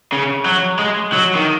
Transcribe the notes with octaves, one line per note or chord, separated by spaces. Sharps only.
C#3
F#3
G#3
F#3
D#3